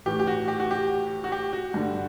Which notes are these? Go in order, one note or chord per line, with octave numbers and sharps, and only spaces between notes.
A2 E3 G4
G4
F#4
G4
F#4
G4
F#4
G4
F#4
G2 D3